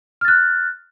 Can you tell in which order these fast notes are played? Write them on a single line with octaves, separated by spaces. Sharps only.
F6 A6 F#6